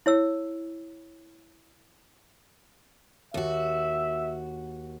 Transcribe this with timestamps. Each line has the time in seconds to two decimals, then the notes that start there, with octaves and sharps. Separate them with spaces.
0.06 E4 C#5 E6
3.34 D#2 F#4 E5